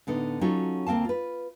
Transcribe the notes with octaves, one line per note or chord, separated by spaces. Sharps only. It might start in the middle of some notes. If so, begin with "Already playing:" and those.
A2 D3 B3 D#4
F#3 C#4 D#4 F4 F#4 A4
D2 A#3 C4 F5 A5
F4 B4